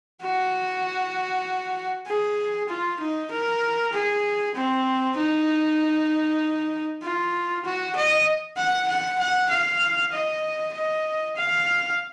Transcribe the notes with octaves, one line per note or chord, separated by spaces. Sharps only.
F#4
G#4
F4
D#4
A#4
G#4
C4
D#4
F4
F#4
D#5
F#5
F#5
F#5
F5
D#5
D#5
F5